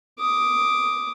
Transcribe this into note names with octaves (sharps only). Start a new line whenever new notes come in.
D6 D#6